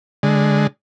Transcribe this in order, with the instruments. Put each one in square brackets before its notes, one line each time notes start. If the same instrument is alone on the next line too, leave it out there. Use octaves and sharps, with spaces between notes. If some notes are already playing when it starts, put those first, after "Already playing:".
[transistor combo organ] D3 G#3